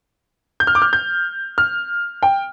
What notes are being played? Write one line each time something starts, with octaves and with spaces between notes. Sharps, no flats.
G6
F6
D6
F6
G6
F6
G5